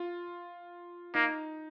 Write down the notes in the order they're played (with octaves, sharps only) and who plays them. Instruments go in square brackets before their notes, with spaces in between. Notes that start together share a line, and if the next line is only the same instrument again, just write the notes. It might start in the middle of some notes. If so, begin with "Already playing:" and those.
Already playing: [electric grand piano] F4
[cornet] A#3 [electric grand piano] D#4